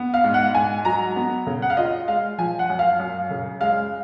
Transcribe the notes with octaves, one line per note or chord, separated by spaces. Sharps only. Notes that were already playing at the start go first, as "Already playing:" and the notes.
Already playing: B3
F5
G#2
F#5
G#2 G#5
F#3 A#5
B3
C#3
F#5
F5
F4 D#5
G#3 F5
F3 G#5
F#5
F#2
F5
F#2
C#3
G#3 F5